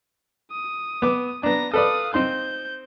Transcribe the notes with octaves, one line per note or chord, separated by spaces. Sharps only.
D#6
B3 D6
B3 D4 A#5 A#6
A4 B4 D5 F5 D#6
C4 D#4 C6 G6